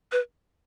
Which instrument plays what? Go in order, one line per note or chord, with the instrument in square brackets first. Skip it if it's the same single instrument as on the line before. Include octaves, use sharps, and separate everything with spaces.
[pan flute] B4